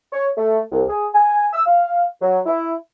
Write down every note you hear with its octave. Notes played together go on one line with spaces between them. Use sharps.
C#5
A3
C2
G#4
G#5
E6
F5
F#3
E4